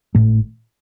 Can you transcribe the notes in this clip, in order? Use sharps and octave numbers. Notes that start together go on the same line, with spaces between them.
G#1 A2 A3